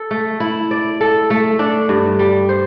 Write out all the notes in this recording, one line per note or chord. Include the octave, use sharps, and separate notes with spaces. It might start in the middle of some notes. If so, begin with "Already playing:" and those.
Already playing: A4
A3
E4
D5
A4
A3
D4
G2
G3
C5